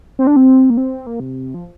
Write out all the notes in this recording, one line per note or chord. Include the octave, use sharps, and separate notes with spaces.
C4
D4
C4
A#3
C4
A#3
C3
F3